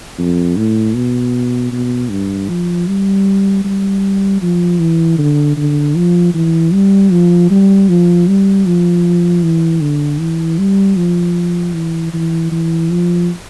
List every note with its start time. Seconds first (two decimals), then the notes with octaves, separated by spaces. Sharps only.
0.18 F2
0.57 A2
0.95 B2
1.72 B2
2.10 G2
2.49 F3
2.88 G3
3.64 G3
4.42 F3
4.80 E3
5.19 D3
5.57 D3
5.96 F3
6.34 E3
6.73 G3
7.12 F3
7.51 G3
7.89 F3
8.28 G3
8.66 F3
9.43 E3
9.81 D3
10.20 E3
10.58 G3
10.97 F3
11.74 E3
12.13 E3
12.51 E3
12.90 F3